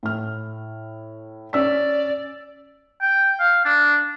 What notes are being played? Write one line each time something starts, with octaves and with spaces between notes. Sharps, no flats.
A2 F6
C#4 D5 E6 B6
G5
F5
D4